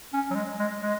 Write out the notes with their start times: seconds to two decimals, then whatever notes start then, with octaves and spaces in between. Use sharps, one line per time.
0.13 C#4
0.30 F#3
0.35 G#3
0.59 G#3
0.82 G#3